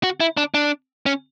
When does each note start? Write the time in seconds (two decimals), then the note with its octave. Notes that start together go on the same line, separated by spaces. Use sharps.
0.03 F#4
0.20 E4
0.37 D4
0.54 D4
1.06 C#4